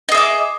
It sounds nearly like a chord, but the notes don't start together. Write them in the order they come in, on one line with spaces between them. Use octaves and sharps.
D#5 G#4 E5 D6